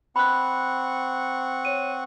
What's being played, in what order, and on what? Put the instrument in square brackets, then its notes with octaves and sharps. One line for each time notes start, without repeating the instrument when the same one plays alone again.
[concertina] C4 F#5 C#6 [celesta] B5 F#6
[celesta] C#5 D#7